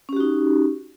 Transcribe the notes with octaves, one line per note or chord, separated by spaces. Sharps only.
C#4 D#4 F#4 G4